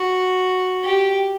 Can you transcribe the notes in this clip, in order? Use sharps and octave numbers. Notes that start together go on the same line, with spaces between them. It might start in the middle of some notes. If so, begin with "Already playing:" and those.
Already playing: F#4
G4